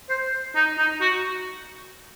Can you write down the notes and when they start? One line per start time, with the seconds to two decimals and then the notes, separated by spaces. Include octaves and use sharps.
0.09 C5
0.55 D#4
0.78 D#4
1.01 F#4